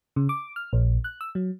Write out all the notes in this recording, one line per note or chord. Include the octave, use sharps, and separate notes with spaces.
C#3
D6
F6
A#1
F#6
E6
F#3